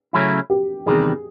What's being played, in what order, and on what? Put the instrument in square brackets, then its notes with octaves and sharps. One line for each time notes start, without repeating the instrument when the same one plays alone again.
[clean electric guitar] C#3 F#3 A3 C#4 E4
[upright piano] G4
[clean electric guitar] E2 C3 D#3 G3 [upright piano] G#4